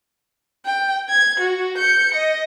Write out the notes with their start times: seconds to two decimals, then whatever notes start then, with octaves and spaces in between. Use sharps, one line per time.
0.65 G5
1.09 G#6
1.40 F#4
1.78 G6 C#7
2.15 D#5